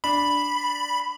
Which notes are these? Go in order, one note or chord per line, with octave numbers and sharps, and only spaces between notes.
D4 B5